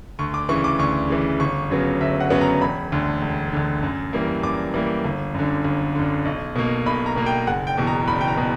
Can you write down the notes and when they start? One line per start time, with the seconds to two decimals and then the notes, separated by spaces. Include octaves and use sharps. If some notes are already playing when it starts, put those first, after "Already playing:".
0.19 D2 C#6
0.34 D6
0.49 C#3 E3 C#6
0.64 D6
0.79 D2 C#6
1.09 C#3 E3
1.40 G1 C#6
1.70 F#2 C#3 F#3 B3
2.01 G1 E5
2.20 F#5
2.30 F#2 C#3 F#3 B3
2.41 A#5
2.61 E1 B5
2.92 D2 D3
3.22 E1
3.52 D2 D3
3.83 F#2
4.13 E3 G3 A#3
4.43 F#2 D6
4.74 E3 G3 A#3
5.04 G1
5.34 F#2 D3
5.64 G1
5.95 F#2 D3
6.25 B1
6.56 B2 A#3
6.86 B1 B5
7.06 A#5
7.16 B2 A#3
7.26 G5
7.47 F#1 F#5
7.67 G5
7.77 E2 B2
7.87 A#5
8.07 F#1 B5
8.21 G5
8.28 A#5
8.37 B2